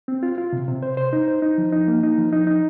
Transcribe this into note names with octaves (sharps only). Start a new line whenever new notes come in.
C4
F4
F4
C3
C3
C5
C5
D#4
C5
D#4
F3
D#4
A#3
D#4
F3
D#4
D#4